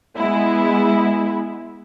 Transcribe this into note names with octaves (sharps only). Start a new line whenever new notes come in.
G#3 B3 E4